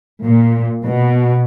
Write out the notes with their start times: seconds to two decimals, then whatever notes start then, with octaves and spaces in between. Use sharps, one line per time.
0.23 A#2
0.84 B2